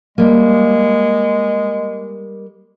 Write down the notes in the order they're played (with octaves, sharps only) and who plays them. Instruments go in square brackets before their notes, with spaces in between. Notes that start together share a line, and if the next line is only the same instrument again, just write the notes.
[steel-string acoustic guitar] G3 A#3 [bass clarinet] G#3